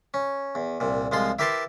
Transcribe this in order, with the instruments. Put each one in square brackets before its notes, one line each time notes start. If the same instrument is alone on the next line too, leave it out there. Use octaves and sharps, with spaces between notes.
[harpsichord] C#4
E2
C2 A#2
C2 F3 G#3 F4 C6
E4 G4 A#4 B4 A5 C6